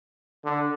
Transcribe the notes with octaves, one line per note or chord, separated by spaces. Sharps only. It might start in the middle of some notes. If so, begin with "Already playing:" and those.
D3